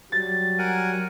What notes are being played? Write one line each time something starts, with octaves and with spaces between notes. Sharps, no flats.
F#3 G3 A6
A#4 F#5 G#5